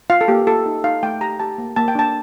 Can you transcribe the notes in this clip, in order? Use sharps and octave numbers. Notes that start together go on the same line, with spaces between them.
F4 F5
A4
A#3 G4
F4 A4
D#4
D#4 F5
A3 G5
G4 A#5
G4 A5
A#3
A#3 A5
G5
D4 A5